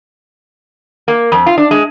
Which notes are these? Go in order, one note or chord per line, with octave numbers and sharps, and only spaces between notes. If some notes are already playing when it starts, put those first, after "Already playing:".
A#3
F2
F4
D4
G#3